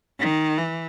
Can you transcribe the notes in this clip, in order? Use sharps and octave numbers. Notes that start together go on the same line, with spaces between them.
D#3
E3